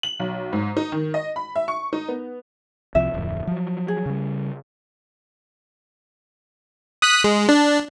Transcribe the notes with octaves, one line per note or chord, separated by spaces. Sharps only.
F#7
B1
G#2
D#4
D#3
D#5
B5
E5
C#6
D#4
B3
C2 C3 F3 E5
D1 F2
F3 F#3
G#4
C#3 G3
D#6 F#6 B6
G#3
D4